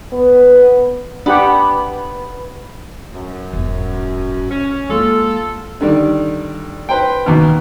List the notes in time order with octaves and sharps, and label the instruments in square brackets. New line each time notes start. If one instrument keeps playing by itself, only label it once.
[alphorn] B3
[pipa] B3 [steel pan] D4 G4 F#5
[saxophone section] F#2
[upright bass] E1 G#2
[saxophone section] C#4
[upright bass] G#3 A#3 [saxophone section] F4 A4
[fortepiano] D3 D#3 G3
B4 C5 G5
D#2 B2